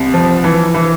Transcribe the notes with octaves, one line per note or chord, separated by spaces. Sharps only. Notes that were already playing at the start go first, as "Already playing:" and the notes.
Already playing: C2
F3
E3
E3